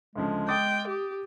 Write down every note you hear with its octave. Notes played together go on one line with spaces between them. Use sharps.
D2 C#3 F3 G#3
G5 D6 D#6 A6
G4